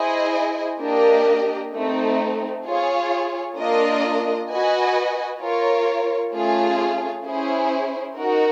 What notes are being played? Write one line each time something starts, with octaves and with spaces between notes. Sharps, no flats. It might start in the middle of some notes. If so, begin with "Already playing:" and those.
Already playing: E4 G#4 C5 D#5 G#5
A#3 D4 G4 A#4 D#5
A3 C4 D#4
F4 G#4 C#5
A#3 D4 F4 A#4 D#5
F#4 B4 D#5 G#5
F4 A#4 C#5
A3 C#4 F4 G#4
C#4 E4 G#4 C5
D#4 F#4 A#4